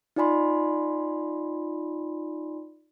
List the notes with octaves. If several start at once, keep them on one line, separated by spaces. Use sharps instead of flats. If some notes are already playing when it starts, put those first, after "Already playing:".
D#4 F4 D5 G#5 B5 C6